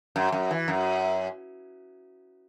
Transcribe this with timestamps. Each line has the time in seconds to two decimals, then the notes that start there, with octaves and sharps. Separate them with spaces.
0.16 F#2
0.32 F#2
0.51 E3
0.68 F#2